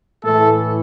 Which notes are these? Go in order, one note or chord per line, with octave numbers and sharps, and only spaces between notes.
A2 E3 A3 A4